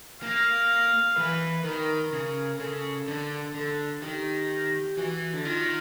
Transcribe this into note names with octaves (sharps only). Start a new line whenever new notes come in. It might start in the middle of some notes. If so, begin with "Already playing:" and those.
A#3 F5
E3 B4
D#3 A#4
C#3
C#3 A4
D3
D3 A4
D#3 G4
E3 F#4
D3
D#3 F4